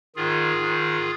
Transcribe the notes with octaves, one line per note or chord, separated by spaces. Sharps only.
G#2 D#3 F4 G#4
G#2 D#3